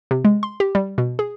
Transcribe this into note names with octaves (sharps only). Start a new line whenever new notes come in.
C3
G#3
C6
G4
G3
B2
G#4